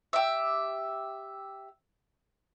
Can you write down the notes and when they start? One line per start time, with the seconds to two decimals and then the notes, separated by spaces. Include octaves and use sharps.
0.13 G4 E5